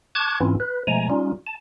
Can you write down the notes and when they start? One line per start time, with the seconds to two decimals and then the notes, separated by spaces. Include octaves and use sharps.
0.15 A5 C#6 D6 F#6 G#6
0.40 G#2 E3 C4 C#4 E4 F4
0.60 B4
0.87 B2 F3 G#3 A3 G#5 A#5
1.10 G3 C#4 D#4 F4
1.47 A5